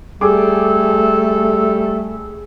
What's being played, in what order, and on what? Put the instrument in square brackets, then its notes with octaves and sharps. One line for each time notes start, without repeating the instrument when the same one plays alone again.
[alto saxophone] G3 [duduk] A3 [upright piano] G#4 D6 [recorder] A4